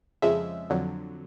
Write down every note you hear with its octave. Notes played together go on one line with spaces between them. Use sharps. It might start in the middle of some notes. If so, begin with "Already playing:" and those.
F2 C#3 F3 G#3 E5
F2 D3 F#3